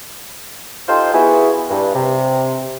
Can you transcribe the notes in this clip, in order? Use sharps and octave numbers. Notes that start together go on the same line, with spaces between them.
D#4 F4 G4 A4 C5
B3 E4 F#4 G#4
G2
C3